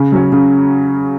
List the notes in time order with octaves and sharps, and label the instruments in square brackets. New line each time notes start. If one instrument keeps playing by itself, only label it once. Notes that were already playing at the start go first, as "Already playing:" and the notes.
Already playing: [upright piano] C#3
F#3 C#4
C#3